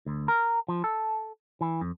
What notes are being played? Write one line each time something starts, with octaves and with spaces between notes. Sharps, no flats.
D2
A#4
F3
A4
E3
F2